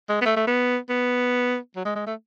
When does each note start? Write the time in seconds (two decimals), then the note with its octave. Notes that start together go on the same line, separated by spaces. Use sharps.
0.09 G#3
0.21 B3
0.25 A3
0.36 A3
0.47 B3
0.89 B3
1.76 F#3
1.85 G#3
1.96 G#3
2.06 A3